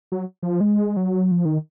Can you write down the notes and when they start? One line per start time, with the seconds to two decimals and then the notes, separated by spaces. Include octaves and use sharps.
0.12 F#3
0.42 F3
0.61 G#3
0.97 F#3
1.31 F3
1.45 D#3